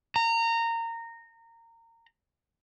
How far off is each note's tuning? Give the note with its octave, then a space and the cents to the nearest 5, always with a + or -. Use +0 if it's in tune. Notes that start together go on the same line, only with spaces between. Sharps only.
A#5 -20